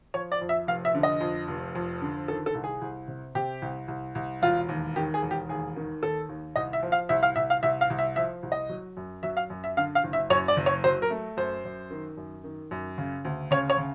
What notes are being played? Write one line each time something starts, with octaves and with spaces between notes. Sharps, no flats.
F3 C#5
D5
F2
E5
F1 F5
E5
D3
D#5
F2
F1
F2
D3
D#3 A4
A4
C2
G#4
C2
C3
C3 G4
C2
C2
C2
E1 F4
D#2
D#3 G4
G#4
E1
G4
D#2 G#4
D#3
D#2 A4
D#2
C2 D#5
E5
F3
F5
C2 E5
F5
C2 E5
F5
C2 E5
F5
C2
E5
F3 E5
C2
D#5
F#3
F#2
F#3 E5
F5
F#2
E5
D3 F5
F5
F#1
E5
F#2 C#5
D5
F#1
C#5
F#3 C5
A#4
A3
F#2 C5
F#2
D#3
F#2
D#3
F#2
C#3
D2
C#3 C#5
C#5
C#3